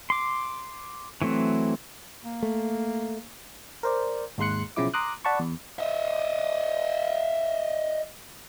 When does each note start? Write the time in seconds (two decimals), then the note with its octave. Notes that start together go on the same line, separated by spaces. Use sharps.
0.10 C6 D6
1.22 E3 F#3 A3 C4
2.24 A#3
2.43 A3
3.83 A#4 C5 D5
4.38 G#1 D#2 G#3 C6 F#6 C#7
4.76 B1 C#3 F3 E4 D6
4.94 A#5 C6 D6 D#6 F#6
5.25 D5 F#5 A5 B5 C#6
5.39 E2
5.79 D#5 E5